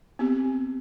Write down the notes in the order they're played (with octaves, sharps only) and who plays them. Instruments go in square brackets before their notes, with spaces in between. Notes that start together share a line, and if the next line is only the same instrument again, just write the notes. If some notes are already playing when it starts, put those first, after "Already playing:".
[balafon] B3 C4 G4